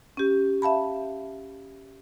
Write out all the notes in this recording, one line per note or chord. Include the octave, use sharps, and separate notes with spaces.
C#4 G4
E5 F5 A5 B5